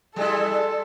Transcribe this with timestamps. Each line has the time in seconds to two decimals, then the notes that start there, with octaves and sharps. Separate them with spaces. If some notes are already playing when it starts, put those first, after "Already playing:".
0.16 G3 G#3 E4 A4